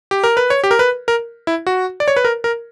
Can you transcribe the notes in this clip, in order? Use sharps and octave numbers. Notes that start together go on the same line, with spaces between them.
G4
A#4
B4
C#5
G4
A#4
B4
A#4
E4
F#4
D5
C#5
B4
A#4
A#4